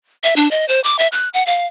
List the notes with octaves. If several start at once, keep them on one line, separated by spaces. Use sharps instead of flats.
E5
D4
D#5
C5
D6
E5
F#6
F#5
F5